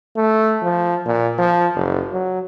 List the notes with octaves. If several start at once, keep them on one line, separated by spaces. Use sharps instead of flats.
A3
F3
A#2
F3
F#1
F#3